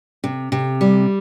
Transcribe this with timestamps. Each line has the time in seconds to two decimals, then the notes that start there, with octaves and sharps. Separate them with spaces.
0.24 C3
0.52 C3
0.81 G3